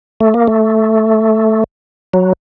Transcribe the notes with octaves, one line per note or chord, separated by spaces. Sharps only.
A3
A#3
A3
F#3